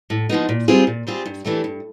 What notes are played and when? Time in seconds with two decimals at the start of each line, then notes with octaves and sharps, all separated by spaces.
0.10 A2
0.29 F3 G#3 B3 D#4
0.49 A#2
0.68 G3 C4 F4 G#4
0.87 A#2
1.07 G3 C4 F4 G#4
1.26 G2
1.45 E3 A3 D4 G4
1.64 G2